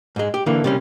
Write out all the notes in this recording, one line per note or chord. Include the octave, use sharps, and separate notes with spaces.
G#2 G#3
G4
D3 E3 A#3
C3 G3 C#4